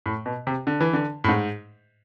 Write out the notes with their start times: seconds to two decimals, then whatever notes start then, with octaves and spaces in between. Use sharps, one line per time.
0.06 A2
0.26 B2
0.47 C3
0.67 D3
0.81 E3
0.93 D3
1.24 A2
1.28 G#2